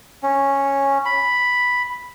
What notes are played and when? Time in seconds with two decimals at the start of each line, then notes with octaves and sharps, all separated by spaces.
0.23 C#4
1.05 B5